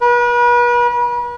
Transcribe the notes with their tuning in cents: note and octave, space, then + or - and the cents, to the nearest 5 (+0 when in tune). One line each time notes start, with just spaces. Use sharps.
B4 -40